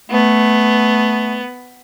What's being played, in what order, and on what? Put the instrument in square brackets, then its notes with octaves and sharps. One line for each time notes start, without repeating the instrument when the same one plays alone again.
[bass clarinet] A3 [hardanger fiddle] B3